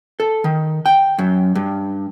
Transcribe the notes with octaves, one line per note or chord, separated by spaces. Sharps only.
A4
D#3
G5
F#2
G2